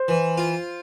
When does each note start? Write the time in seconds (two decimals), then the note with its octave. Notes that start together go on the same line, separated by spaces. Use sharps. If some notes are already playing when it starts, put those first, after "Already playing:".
Already playing: C5
0.08 E3
0.38 F4